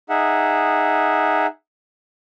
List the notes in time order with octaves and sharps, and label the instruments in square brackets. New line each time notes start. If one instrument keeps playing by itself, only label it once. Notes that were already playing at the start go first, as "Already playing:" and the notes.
[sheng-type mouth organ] D#4 G#4 E5 F#5